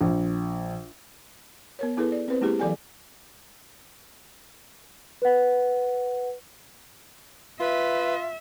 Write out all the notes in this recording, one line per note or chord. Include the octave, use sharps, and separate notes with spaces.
A#1
B3 A#4 C#5
B3 E4 G#4 A4 B4
D5
C4 B4 C5
G#3 A#3 E4 G4 G#4
E3 F#3 A4 D5 G5 G#5
B4 F#5
F4 B4 E5